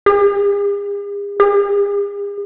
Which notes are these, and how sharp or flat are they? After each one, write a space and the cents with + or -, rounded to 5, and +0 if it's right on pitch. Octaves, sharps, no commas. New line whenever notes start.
G#4 -45
G#4 -45